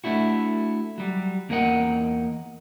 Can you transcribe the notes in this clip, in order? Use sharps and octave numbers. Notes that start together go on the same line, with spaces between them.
A3 D4 E4 F#4
F#3 G3
E2 A#3 D#4 A#4 D#5 F#5